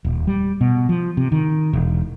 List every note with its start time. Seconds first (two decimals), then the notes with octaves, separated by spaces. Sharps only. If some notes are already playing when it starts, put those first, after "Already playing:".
0.05 D#1
0.27 G3
0.61 B2
0.89 F3
1.17 C3
1.32 D#3
1.73 E1